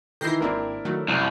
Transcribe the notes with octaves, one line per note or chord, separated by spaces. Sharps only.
D#3 E3 E4 G6 A#6 C7
G#1 A#3 C4 D4 E4 A#4
D#3 F#3 A3
C2 F#2